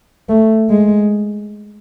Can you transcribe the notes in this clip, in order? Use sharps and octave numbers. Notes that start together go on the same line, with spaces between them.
A3
G#3